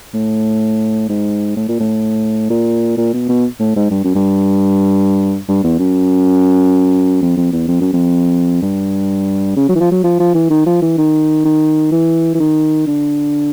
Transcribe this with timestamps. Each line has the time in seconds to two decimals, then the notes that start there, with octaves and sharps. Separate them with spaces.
0.14 A2
1.09 G#2
1.56 A2
1.68 A#2
1.80 A2
2.50 A#2
2.97 A#2
3.13 B2
3.29 B2
3.60 A2
3.76 G#2
3.91 G2
4.04 F#2
4.15 G2
5.49 G2
5.63 E2
5.79 F#2
7.22 F2
7.36 F2
7.52 E2
7.68 F2
7.81 F#2
7.93 F2
8.62 G2
9.56 C#3
9.69 F#3
9.75 E3
9.80 F3
9.91 F#3
10.04 F3
10.19 F3
10.34 E3
10.50 D#3
10.66 F3
10.82 E3
10.98 D#3
11.45 D#3
11.92 E3
12.34 E3
12.40 D#3
12.87 D3